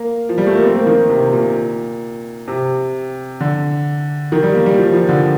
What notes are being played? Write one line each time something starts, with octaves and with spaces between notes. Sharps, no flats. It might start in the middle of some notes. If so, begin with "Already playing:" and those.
Already playing: A#3
F3
G3
A3
A#3
C4
A#3
D#3
C3
A#2
C3
D3
D#3
G3
A#3
G3
F3
F3
D3